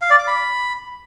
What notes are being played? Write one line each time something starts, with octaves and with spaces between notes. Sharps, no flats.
F5
D5
D6
B5